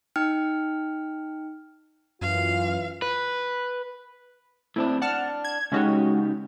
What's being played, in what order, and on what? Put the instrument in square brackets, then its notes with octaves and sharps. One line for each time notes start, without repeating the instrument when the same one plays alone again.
[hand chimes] D#4 G5 F6
[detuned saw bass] F#2 [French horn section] E3 F4 [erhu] F5
[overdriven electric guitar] B4
[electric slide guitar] A2 C4 D4 [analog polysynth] E4
[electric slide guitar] D4 [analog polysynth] F#5 A5 F6
[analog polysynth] G#6
[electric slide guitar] C#3 D#4 G4 [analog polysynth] G#3 C#4 F#4